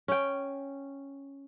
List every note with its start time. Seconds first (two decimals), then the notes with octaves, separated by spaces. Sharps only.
0.08 C#4 G5